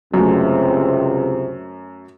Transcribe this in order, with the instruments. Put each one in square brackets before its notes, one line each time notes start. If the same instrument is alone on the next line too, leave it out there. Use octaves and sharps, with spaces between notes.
[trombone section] C#2 C3 [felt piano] F#2 A3